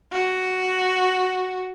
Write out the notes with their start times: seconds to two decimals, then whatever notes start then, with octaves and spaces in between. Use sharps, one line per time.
0.13 F#4